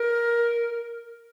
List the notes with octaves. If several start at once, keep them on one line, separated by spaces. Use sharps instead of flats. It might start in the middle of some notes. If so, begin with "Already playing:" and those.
Already playing: A#4